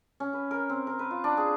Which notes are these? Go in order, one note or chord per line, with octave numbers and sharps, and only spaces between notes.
C#4
B4
A#4
C4
A#4
B4
F4
D4
G#4